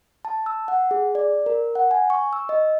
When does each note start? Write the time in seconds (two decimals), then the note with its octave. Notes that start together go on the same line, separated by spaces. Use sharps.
0.25 A5
0.46 E6
0.68 F#5
0.91 G#4
1.15 D5
1.46 A#4
1.75 F#5
1.91 G#5
2.10 C#6
2.33 E6
2.49 D#5